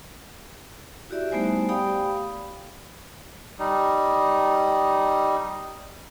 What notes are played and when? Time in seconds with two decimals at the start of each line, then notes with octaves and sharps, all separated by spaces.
1.10 E4 F#4 G4 D5 E5
1.31 G3 A3 B3 D#4 C5 G#5
1.69 G4 D5 F5 G5 B5 D#6
3.59 G3 D#4